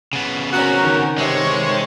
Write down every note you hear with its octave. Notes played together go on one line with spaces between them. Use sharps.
C#3 B3
C4 C#4 F#4 A#4
D#3
G2 C3 G#3 C#5 C#6